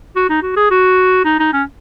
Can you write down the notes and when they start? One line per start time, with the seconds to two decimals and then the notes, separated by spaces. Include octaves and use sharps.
0.16 F#4
0.30 D#4
0.42 F#4
0.56 G#4
0.71 F#4
1.25 D#4
1.40 D#4
1.53 C#4